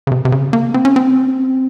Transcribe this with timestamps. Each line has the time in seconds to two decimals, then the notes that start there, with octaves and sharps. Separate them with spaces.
0.07 C#3
0.12 C3
0.25 C3
0.32 C#3
0.53 A#3
0.74 C4
0.85 C#4
0.96 C4